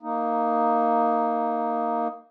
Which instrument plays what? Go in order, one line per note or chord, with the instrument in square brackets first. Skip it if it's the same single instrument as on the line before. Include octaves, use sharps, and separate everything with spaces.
[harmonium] A#3 D#4